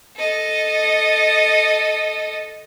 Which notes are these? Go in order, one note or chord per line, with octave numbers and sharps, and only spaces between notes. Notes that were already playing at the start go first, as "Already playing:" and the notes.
A4 D#5